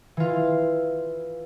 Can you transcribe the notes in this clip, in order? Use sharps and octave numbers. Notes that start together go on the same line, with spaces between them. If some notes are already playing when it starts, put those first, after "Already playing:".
E3 F4